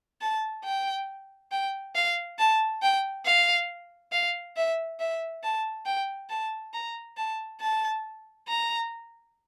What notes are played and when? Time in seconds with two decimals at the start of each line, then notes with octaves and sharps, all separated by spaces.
0.21 A5
0.65 G5
1.52 G5
1.95 F5
2.39 A5
2.82 G5
3.25 F5
4.12 F5
4.56 E5
5.00 E5
5.43 A5
5.86 G5
6.30 A5
6.74 A#5
7.17 A5
7.61 A5
8.48 A#5